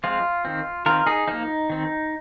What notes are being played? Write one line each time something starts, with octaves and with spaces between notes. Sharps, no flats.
F3 G#3 C4 F4
D#3 C4
D#3 C4 F4 A#4
D#4 G#4
F3 A#3 D#4
D#3 C4